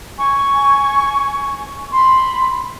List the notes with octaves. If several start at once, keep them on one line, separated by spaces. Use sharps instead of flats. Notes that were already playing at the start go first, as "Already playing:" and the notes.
G#5 C#6
B5 C6